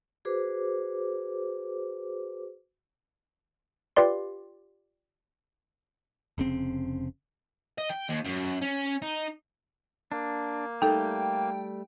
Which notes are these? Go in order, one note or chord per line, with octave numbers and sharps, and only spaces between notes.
F#4 G#4 B4 C5 D6
F4 G4 B4 D5 C6
F1 C#3 C4
D#5
G5
D#2
F#2
C#4
D#4
A#3 D4
G3 A3 D#4 A4 G5